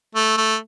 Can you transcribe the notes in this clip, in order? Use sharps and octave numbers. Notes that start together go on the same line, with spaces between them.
A3
A3